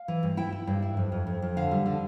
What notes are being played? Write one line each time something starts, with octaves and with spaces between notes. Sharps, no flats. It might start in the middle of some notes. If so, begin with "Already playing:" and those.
Already playing: F5
E3
G2
E4 G5
E4
G2
E4
F2
F2
F2
F2
D3 F5
G3
D3